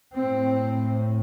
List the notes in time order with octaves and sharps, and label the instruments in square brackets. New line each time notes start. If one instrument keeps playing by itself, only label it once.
[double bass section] A2 C4